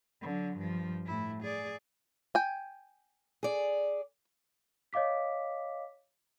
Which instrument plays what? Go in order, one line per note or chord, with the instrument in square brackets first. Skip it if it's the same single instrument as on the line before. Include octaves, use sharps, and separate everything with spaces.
[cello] D3 F#3
G2 F3
A2 E4
G#4 D5
[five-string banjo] G5 G#5
[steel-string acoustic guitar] G#4 D5
[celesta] C#5 D#5 F5 D6 B6